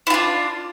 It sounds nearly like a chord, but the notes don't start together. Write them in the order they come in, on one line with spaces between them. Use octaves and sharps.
E4 F4 D4